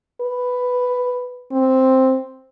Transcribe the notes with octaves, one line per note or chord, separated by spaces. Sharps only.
B4
C4